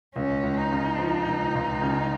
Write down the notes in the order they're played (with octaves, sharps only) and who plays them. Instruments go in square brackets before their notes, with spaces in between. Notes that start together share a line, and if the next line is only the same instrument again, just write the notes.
[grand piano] C#2 [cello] C#4
[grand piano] C#2
[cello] D#4
[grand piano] C#3
F3
C#2
C#2
C#3